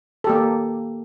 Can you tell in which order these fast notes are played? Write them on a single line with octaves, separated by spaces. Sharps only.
A4 G4 A#3